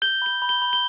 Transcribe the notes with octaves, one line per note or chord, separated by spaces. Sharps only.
G6 G7
B5 G7
B5
G7
B5
G7